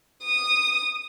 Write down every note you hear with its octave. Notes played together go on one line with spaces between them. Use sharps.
D#6